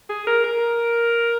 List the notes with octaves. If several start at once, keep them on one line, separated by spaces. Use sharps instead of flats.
G#4
A#4
A#4